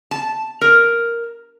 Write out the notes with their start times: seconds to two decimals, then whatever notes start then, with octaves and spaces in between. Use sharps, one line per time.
0.11 A5
0.61 A#4